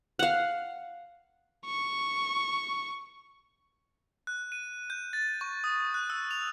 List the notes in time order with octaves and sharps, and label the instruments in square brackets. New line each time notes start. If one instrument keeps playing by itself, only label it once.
[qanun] F5 F#5
[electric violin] C#6
[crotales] F#6
D#7
G6
A6
C#6
D#6
F#6
E6
F7